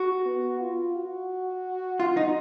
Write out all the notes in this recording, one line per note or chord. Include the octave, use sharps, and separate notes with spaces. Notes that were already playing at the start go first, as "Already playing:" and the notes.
Already playing: F#4
B3
F4
F#4
F4
D#4